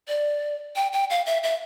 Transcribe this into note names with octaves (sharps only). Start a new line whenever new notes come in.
D5
G5
G5
F5
E5
E5